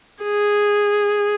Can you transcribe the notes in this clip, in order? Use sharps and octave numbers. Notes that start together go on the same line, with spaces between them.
G#4